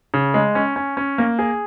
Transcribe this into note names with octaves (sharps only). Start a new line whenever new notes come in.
C#3
G#3
C#4
C#4
C#4
A#3
G#4